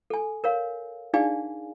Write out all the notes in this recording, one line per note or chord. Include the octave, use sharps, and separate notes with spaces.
A4 G#5
A#4 C#5 F5
D4 D#4 G#4 D5 F5 G#5